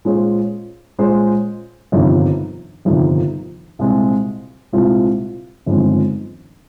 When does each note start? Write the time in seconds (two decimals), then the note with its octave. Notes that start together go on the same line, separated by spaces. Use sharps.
0.05 A#2 G#3 C#4 G#4 C5
0.99 A#2 G#3 C#4 G#4 C5
1.92 G1 F2 C3 D#3
2.85 G1 F2 C3 D#3
3.79 C2 A#2 G#3 C4 F4
4.73 C2 A#2 G#3 C4 F4
5.66 G1 F2 D#3 G#3 C4